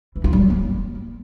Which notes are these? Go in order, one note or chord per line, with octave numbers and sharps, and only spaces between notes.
E3
F4
G3
F#3
A#3